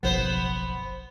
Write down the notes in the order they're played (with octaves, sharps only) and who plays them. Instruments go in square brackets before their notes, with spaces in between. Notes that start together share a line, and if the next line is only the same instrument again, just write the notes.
[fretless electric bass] F#1 B1 F3 [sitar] B3 C5